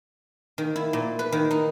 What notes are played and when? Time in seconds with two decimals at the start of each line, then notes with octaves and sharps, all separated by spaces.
0.58 D#3
0.76 E4
0.93 A#2
1.19 B4
1.32 D#3
1.51 D#4